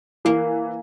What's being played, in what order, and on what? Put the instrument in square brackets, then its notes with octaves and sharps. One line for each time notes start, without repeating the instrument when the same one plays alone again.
[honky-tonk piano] E3 [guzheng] A#3